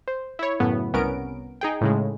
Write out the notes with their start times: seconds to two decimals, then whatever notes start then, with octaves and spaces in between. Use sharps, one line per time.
0.08 C5
0.39 E4 C#5
0.60 F#2 A2 C#3 B3
0.93 C2 B3 C#4 A#4 D7
1.61 D#4 G#4 G5
1.81 A2 C#3 G#3